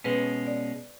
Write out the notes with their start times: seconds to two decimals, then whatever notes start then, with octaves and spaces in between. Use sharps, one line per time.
0.04 B2 G#3 C#4 B4
0.47 D5